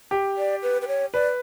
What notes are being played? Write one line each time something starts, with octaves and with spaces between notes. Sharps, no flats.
G4
D5
B4
B4
C#5
B4 D5